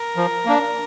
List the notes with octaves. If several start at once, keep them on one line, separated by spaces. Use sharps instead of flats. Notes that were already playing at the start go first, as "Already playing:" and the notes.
Already playing: A#4
F3
A#3 D4